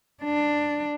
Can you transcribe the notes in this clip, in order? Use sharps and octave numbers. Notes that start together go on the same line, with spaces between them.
D4